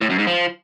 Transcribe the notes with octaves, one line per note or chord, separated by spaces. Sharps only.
A2
F#2
G#2
F3